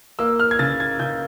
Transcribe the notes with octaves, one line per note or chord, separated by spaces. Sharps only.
A#3 E6
F6
G#6
C#3 A6
G#6
C#3 G6